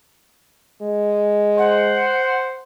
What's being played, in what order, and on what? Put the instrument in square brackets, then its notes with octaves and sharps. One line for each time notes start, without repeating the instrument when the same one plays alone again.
[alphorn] G#3
[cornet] C5 [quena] F#5